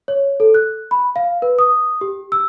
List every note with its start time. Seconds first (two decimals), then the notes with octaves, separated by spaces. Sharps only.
0.08 C#5
0.40 A4
0.54 F#6
0.91 B5
1.16 F5
1.42 B4
1.59 D#6
2.01 G4
2.32 E6